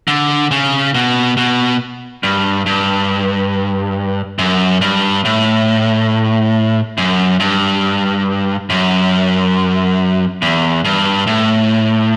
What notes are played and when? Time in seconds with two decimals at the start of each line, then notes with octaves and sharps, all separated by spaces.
0.08 D3
0.51 C#3
0.95 B2
1.37 B2
2.23 G2
2.66 G2
4.39 F#2
4.81 G2
5.25 A2
6.98 F#2
7.40 G2
8.70 F#2
10.42 E2
10.85 G2
11.27 A2